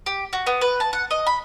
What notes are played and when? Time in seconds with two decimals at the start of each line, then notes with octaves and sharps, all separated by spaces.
0.06 G4
0.33 F#4
0.47 B3
0.61 B4
0.80 A5
0.93 F#5
1.11 D#5
1.27 B5